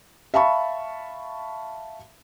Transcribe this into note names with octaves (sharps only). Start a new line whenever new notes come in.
E5 F5 A5 B5 C#6